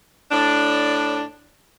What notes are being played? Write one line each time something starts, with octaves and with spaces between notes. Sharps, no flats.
A2 D4